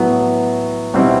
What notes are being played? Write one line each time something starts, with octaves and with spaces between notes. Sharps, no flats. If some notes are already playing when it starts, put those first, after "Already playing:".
Already playing: A2 F#3 B3
B2 G3 C4 E4